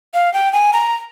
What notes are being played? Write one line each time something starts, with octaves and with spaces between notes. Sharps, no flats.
F5
G5
G#5
A#5